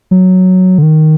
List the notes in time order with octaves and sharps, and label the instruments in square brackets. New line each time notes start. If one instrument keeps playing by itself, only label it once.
[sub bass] F#3
D3
D#3